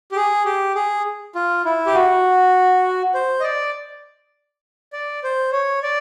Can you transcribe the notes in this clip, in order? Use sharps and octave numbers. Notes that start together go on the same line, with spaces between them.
G4
G#4
G4
G#4
F4
E4
G4
F#4
C5
D#5
D5
D5
C5
C#5
D5